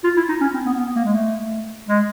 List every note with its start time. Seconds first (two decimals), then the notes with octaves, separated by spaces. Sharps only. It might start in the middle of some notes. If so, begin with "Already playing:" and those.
0.04 F4
0.17 E4
0.29 D#4
0.41 C#4
0.54 C4
0.66 B3
0.78 B3
0.96 A#3
1.05 G#3
1.14 A3
1.88 G#3